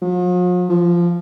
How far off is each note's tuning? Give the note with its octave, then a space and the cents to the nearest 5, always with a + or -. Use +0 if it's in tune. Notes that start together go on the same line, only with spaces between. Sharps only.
F3 +45
F3 -15